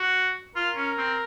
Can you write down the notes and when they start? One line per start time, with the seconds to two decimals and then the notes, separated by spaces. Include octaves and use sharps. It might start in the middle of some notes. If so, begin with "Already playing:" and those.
Already playing: F#4
0.55 F4 A#4
0.77 C#4
0.98 C4